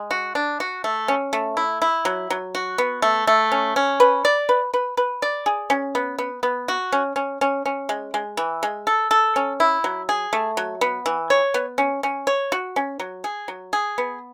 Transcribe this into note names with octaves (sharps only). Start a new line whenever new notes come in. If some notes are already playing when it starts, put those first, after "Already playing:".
Already playing: G#3
F#4
D4
F#4
A3
C#4
A3
E4
E4
F#3
F#3
F#4
B3
A3
A3
C#4
C#4
B4
D5
B4
B4
B4
D5
G#4
C#4
B3
B3
B3
F#4
C#4
C#4
C#4
C#4
G#3
G#3
E3
G#3
A4
A4
C#4
E4
F#3
G#4
A3
F#3
B3
E3
C#5
B3
C#4
C#4
C#5
F#4
C#4
F#3
G#4
F#3
G#4
B3